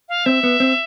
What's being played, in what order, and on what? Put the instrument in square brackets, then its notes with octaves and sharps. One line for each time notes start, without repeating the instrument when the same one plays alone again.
[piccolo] F5
[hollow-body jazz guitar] C4 [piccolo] E5
[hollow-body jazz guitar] B3
C4